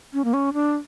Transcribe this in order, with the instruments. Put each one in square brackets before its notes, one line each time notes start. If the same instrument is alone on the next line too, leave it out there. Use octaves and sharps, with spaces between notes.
[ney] C#4
A#3
C#4
D4